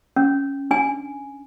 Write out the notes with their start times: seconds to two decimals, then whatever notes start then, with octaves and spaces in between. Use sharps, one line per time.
0.16 C#4
0.71 D4 G#5